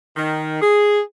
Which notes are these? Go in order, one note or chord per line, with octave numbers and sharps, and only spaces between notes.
D#3
G#4